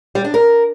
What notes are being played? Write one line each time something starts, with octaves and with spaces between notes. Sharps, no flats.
G3
D4
A#4